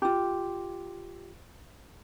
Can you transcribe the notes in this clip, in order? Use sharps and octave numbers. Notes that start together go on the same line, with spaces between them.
F4 G4